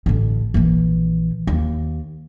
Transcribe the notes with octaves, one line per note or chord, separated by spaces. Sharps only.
A1 D3
A#1 E3
D#2